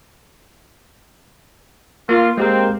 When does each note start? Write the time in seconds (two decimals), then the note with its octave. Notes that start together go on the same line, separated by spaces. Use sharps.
2.09 A#3 F4
2.37 G#3 A#3 C4 G4 A#4